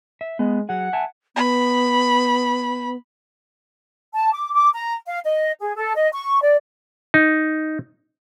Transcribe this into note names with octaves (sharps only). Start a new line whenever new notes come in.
E5
G#3 B3
F#3 G#4 F#5
E5 G#5 A5
B3 B5
A5
D6
D6
A#5
F5
D#5
G#4
A4
D#5
C#6
D5
D#4